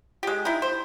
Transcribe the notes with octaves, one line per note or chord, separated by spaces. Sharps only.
G#3 G4
D#4 E4
C5